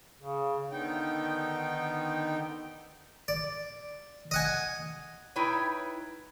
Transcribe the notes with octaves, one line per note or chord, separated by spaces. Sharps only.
C#3
D3 D#3 B3 D#4 G5
D5
D#5 F#5 G#5
D#4 E4 B4 C#5 G5 G#5